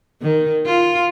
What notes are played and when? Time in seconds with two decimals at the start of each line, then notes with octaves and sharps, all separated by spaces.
0.22 D#3
0.66 F4